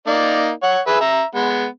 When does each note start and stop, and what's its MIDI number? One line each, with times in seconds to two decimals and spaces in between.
0.07 0.50 58
0.07 0.50 63
0.07 0.50 74
0.63 0.80 73
0.63 0.80 78
0.87 0.98 68
0.87 0.98 71
0.87 0.98 76
1.01 1.23 76
1.01 1.23 82
1.35 1.66 56
1.35 1.66 59